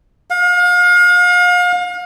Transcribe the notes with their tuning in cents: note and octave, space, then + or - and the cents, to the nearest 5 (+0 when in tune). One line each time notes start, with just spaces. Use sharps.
F5 +35